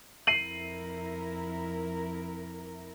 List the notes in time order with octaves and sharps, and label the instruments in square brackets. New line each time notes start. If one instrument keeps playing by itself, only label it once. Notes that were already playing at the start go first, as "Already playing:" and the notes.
[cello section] F2 E4 A#4 [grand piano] C7 D#7 F#7